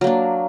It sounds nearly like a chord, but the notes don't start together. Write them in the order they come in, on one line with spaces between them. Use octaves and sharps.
F#3 A#3 D4